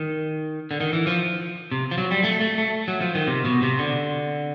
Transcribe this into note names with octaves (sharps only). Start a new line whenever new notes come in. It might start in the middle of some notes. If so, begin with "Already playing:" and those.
Already playing: D#3
D3
D#3
E3
F3
C3
F3
F#3
G3
A3
A3
A3
F#3
F3
D#3
C3
B2
C3
D3